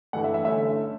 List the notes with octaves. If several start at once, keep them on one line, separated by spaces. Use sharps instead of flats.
G2 E3 A3 F#5
E5
E5
D3 A3 C#4 E5